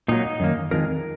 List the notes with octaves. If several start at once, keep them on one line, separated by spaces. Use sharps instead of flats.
A#2 F#3 A#3 D#4
F#2 D#3 A#3
F2 D#3 G#3 A#4